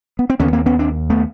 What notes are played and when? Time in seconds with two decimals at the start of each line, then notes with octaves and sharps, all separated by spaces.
0.19 B3
0.30 C4
0.40 D#2 D3 B3 C#4
0.53 A#3 C4
0.66 B3 C#4
0.79 C4 D4
1.10 A3 B3